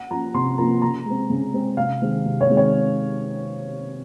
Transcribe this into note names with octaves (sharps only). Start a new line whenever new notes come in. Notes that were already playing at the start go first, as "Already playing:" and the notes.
Already playing: F#5
F3 A#3 C#4 A#5
C3 C6
F3 A#3 C#4 A#5
C#3 A#5
G#3 C4
C#3
G#3 C4
C3 F5
D#3 G#3 C4
C3
C#5
D#3 G#3 C4
C#5